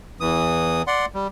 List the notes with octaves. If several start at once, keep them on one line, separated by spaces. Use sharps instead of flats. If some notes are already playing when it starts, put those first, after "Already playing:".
E2 E3 D#6
D5 F#5 C6
G3